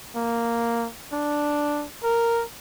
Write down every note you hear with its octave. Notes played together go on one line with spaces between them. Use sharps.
A#3
D4
A#4